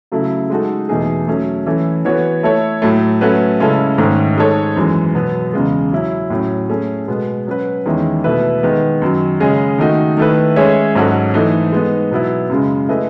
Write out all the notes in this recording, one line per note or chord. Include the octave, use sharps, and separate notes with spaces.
C#3 F#3 A3 E4 A4
G#3 D#4 F#4 A4
E2 B2 A3 D#4 G#4
F#3 A3 C#4
E3 A3 C#4 E4
E3 B3 F#4 C#5
A3 E4 A4 C#5
A2 F#3 A3
F#3 A3 C#4 F#4 B4
C#3 G#3 C#4 E4 A4
G#2 D#3 A3 C#4
G#3 D#4 A4 C#5
F#2 E3 G#3
B2 F#3 B3
E2 C#3 G#3
F#3 C#4 E4
A2 F#3 C#4
A3 C#4 G#4
B2 G#3 B3
F#3 C#4 F#4 B4
E2 D#3 G#3 C#4 E4
B2 A3 E4 B4 E5
D#3 G#3 B3
F#2 D#3 F#3
C#3 G#3 C#4 G#4 D#5
D#3 A3 D#4 F#4
D#3 A3 E4 B4
G#3 C#4 G#4 C#5 E5
G#2 F#3 C#4 F#4 A4
E3 A3 D#4
G#3 B3 D#4
B2 F#3 B3 E4
F#2 C#3 G#3
A3 E4 G#4 B4 D#5